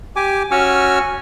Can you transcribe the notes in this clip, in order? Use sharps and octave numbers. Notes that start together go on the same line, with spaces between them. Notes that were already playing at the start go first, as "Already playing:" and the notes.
G4 G#5 D6
C#4 F#4 G#5 C#6 E6 F6